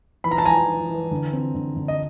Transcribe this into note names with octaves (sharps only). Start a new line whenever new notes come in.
E3 B5
A#5
A5
E3 G#5 A#5
E3
E3
D3
C4
D3
D3
D#5